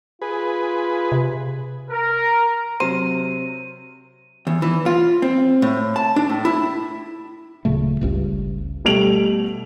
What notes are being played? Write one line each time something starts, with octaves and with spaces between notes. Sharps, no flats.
F4 G#4 B4
C3
A#4
C3 F#3 C5 D#7
E2
E3
F4
C4
A2
A5
D4
A2
E4
D1 A#2 C#3 A3
G1 C#2 G2
B2 G3 A3 D7 F7 F#7